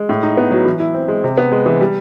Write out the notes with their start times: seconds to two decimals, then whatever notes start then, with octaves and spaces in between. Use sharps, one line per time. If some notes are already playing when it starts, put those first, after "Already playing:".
Already playing: G#3
0.09 A2
0.23 D#4
0.37 B3
0.51 F#3
0.66 E3
0.80 E4
0.94 C4
1.08 G#3
1.24 C3
1.38 B3
1.52 G#3
1.66 E3
1.81 G3